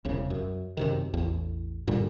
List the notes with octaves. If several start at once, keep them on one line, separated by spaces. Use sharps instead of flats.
E1 C2 C#3
F#2
F#2 C3 D#3
A1 E2
G2 A#2 D3 G3